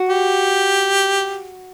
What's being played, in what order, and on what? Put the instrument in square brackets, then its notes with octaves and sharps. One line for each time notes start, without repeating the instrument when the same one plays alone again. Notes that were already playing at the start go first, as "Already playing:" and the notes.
Already playing: [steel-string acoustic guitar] F#4
[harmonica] G4